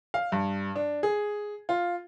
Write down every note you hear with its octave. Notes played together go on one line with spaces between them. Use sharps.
F5
G2
D4
G#4
F4